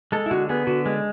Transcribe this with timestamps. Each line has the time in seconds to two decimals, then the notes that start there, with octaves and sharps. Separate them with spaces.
0.12 G#3 A4
0.26 E4
0.31 D3 F#4
0.49 B3 G#4
0.67 D3 F#4
0.86 G#3